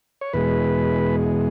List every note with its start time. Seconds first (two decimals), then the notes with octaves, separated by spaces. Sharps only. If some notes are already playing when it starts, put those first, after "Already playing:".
0.21 C#5
0.33 E2 B2 G#3 B4